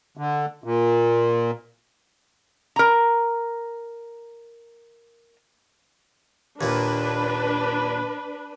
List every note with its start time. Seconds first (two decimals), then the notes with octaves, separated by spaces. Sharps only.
0.17 D3
0.64 A#2
2.76 A#4 A#5
6.61 D#2 A#2 D4 B4